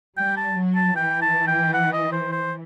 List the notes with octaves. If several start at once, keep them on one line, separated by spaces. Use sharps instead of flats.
G3 G5
A5
F#3
A5
E3 G5
A5
G5
F#5
D#5
C5
C5